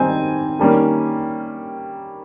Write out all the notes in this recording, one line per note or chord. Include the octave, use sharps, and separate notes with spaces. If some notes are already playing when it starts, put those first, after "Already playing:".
Already playing: D#3 G3 C4 D#4 G#5
D#3 G3 A#3 C#4